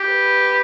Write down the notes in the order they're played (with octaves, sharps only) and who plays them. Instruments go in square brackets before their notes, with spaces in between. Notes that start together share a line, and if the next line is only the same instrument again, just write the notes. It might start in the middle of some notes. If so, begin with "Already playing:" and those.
Already playing: [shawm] G4
[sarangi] B4